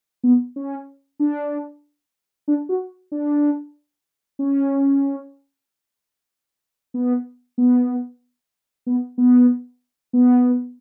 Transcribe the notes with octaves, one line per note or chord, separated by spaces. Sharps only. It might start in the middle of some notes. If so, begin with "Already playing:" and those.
B3
C#4
D4
D4
F#4
D4
C#4
B3
B3
B3
B3
B3